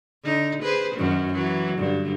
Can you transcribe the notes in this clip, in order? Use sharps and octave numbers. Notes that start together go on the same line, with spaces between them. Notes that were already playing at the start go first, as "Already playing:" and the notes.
D3 D#4
G#4 B4 C5
F#2 D#3 F#3
E3 F#3
G2 D3